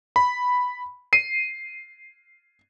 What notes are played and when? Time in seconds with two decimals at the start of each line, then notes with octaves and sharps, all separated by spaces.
0.16 B5
1.13 C7 D#7